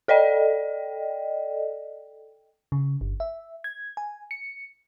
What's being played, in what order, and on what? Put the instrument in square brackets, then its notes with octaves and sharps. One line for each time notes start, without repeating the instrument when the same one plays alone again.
[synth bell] A4 D5 D#5 G5
[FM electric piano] C#3
G1
E5
G#6
G#5
C#7